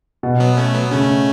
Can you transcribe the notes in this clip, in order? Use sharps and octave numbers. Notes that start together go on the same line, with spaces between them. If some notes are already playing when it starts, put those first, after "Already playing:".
B2
F#3 B3
A3 C#4
F#3 B3
C#3 A3 C#4